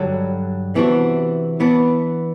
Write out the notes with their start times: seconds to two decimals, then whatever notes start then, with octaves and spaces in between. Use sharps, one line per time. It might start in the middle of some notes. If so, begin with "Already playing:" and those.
Already playing: G2 D3 F#3
0.75 C3 E3 B3 D4 F#4
1.60 E3 B3 D4